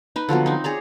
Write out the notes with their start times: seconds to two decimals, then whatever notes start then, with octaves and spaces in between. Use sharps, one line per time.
0.16 D#4 B4
0.29 D3 F3 F#3 B3
0.46 C4 D#4
0.64 G#4 C#5 D5 A#5